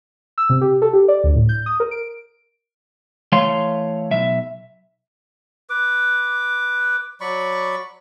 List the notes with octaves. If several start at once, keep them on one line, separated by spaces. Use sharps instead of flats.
E6
C3
G4
A4
G4
D5
D2
A2
G6
D#6
A#4
D7
E3 A3 C#5 F5 C6
B1 E5
B4 D6
F#3 D5 B5 C#6